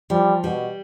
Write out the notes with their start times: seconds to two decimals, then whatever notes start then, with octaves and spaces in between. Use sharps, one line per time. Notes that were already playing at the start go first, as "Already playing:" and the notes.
0.10 F3 G3
0.44 B2 G3